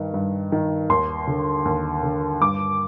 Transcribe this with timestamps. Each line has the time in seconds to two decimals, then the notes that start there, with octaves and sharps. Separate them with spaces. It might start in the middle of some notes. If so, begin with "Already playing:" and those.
Already playing: G2 D#3
0.14 G2
0.52 D#3
0.89 D#2 C6
1.27 D3
1.65 D#2
2.03 D3
2.41 G2 D6